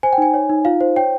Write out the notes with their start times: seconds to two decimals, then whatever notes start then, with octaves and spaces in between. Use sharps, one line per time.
0.03 C5 G#5
0.13 G5
0.18 D#4 G#5
0.34 C#5
0.50 D#4
0.65 F4 F5
0.81 C5
0.96 C#5 G5